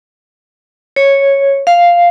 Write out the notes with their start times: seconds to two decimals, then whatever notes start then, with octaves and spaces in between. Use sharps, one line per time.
0.96 C#5
1.67 F5